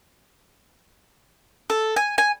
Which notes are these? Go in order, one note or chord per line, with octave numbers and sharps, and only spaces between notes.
A4
G#5
G#5